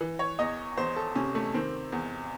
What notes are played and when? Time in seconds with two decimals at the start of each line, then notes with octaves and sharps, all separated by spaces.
0.01 E3
0.19 C#5
0.39 E2 D#5
0.78 E2 C5
0.96 A4
1.15 C3 C#4
1.35 A3
1.54 D#3 C4
1.92 E2